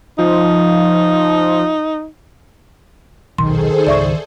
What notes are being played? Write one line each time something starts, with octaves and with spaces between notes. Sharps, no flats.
F3 D#4
D#1 B1 D#3 G#4 A4 C5 C6
C#2 G#2 D5 E5 C#6